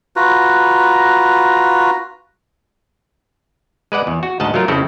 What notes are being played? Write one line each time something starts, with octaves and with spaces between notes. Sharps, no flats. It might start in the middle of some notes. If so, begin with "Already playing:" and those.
F4 F#4 B4 A#5
G#3 B4 D5 F#5
E2
F#4
D2 G#2 D#5 F#5 A5
F#3 A3 F4 A#4
F2 C#3 C4 E4 A4